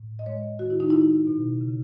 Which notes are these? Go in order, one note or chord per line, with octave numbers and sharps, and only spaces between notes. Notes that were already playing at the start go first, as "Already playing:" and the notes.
Already playing: A2
D#5
G#3 C#5
D#3 F#4
E4
D#4
G#3 E4
B2
C#3